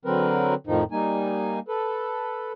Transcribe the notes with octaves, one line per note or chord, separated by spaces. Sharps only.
D3 F#3 C4 A#4 B4
F2 A2 D#3 F3 D#4
G3 A#3 D#4 G#5
A4 B4